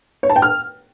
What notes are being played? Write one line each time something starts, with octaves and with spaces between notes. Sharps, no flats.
C#5
A5
G5
F6